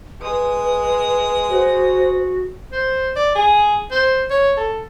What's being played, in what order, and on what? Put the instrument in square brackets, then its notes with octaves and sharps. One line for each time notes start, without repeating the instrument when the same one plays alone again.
[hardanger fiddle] G#3 D#6 [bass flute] B4
[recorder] F#4 [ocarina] C5
[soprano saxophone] C5
D5
G#4
C5
C#5
A4